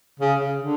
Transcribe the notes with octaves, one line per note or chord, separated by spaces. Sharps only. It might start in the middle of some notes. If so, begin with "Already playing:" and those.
C#3
C#3
D3